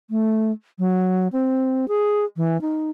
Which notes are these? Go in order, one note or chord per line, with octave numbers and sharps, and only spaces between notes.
A3
F#3
C4
G#4
E3
D#4